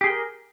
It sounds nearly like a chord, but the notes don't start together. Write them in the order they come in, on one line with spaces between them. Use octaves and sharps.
G4 G#4 G5 A#4